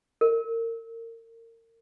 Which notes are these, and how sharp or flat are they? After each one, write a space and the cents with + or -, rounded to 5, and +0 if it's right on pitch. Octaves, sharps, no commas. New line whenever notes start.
A#4 -35